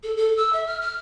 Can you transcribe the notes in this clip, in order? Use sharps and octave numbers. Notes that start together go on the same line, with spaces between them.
A4
A4
E6
E5
F6
F6